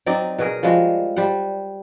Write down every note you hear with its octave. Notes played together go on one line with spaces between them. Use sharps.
F#3 C4 D#4 D5
B2 F#4 G#4 A#4
F3 G3 G#3 F#4
G3 C5 F#5